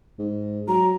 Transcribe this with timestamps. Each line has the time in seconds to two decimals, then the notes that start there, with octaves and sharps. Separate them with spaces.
0.19 G#2
0.68 F#3 A#5